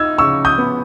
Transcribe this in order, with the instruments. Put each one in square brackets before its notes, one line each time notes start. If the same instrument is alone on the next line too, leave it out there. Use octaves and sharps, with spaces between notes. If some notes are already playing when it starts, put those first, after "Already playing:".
Already playing: [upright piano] D#4 [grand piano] E6 G#6
[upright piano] C#3 [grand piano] C#6 E6
[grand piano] D#6 G6
[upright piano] B3